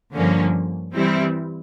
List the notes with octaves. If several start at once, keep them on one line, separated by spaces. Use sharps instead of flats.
G2 D3 F3 A#3 C#4
E3 G3 C4 E4